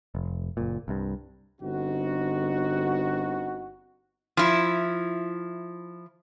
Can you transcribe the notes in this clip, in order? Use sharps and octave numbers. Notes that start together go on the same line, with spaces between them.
F1
F#1 A#2
C2 G2
G1 D3 C4 D#4 F#4
F3 E4